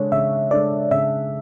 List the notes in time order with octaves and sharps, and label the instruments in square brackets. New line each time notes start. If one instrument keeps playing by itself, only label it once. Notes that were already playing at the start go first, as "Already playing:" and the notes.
Already playing: [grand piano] C#3 G#3 D4 A4 [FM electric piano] C#5
[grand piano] C#3 [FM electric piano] E5
[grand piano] G#3 D4 A4 [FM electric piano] D5
[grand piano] C#3 [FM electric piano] E5